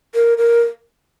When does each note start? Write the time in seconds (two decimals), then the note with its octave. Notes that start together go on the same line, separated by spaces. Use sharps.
0.15 A#4
0.38 A#4